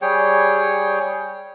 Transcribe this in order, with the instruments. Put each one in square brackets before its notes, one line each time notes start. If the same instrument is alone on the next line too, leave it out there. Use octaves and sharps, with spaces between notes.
[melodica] G3 G#4 C#5 G5